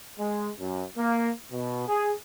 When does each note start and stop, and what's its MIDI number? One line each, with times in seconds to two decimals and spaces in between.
0.19 0.49 56
0.60 0.84 42
0.97 1.30 58
1.52 1.87 47
1.88 2.12 68